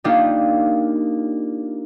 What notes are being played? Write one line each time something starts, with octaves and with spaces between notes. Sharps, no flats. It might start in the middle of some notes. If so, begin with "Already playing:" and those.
A#3 D4 D#4 F4 G4